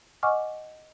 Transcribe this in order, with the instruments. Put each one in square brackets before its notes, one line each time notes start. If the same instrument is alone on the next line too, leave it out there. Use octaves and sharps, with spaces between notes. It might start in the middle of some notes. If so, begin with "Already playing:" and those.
[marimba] D#5 F#5 G#5 C#6 D6 F6